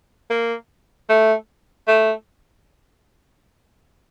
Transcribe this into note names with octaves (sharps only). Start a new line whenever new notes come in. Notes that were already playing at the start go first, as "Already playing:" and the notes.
A#3
A3
A3